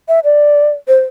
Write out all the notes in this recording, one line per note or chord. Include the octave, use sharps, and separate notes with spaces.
E5
D5
C5